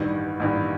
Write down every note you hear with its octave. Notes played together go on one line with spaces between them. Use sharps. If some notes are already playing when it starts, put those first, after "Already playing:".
Already playing: A1 G2 D#3
A1 G2 D#3